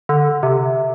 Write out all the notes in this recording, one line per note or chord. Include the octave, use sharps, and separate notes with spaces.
D3
C3